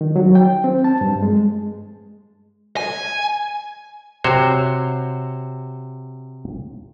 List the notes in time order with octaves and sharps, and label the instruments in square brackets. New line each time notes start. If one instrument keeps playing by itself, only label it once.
[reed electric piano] D#3
F#3
G5
C4
A5
G2
G#3
[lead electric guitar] G#5
[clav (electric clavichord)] C3 F#4 C5 C#5